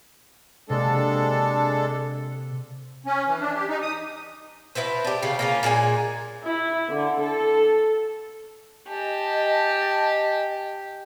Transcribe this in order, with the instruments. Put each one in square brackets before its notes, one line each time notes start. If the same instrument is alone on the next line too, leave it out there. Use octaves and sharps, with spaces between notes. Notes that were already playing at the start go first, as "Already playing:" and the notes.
[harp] C3 A#3 [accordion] G#3 D4 A4
[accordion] C#4
E3
D4
G4
D#4
D#6
[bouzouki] B2 E4 B4 C5
D4 G4
C#3 F4
A#3 C#4 F4
A#2 G#3 F#4 G#5
[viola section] E4
D3
A4
[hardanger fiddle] G4 [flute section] D#5 G#5 A5